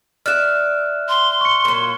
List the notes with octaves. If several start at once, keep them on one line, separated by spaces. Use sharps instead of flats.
D5 E5 F6 F#6 E7
C6
C#6 C#7
A#2 F#3